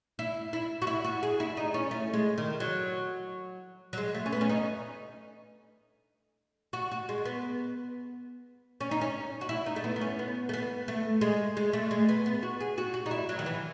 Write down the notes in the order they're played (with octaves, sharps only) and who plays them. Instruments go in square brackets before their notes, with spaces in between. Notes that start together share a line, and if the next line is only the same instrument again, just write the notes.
[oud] E4
E4
F#4
E4
F#4
G#4
E4
D#4
C#4
A3
G#3
D#3
F#3
F#3
G#3
A3
C#4
B3
C#4
D#4
F#4
F#4
G#3
B3
C#4
D#4
C#4
F#4
E4
D#4
A3
B3
B3
C#4
B3
A3
B3
A3
G#3
G#3
A3
G#3
B3
B3
F#4
G#4
F#4
F#4
D#4
E4
F#3
D#3
E3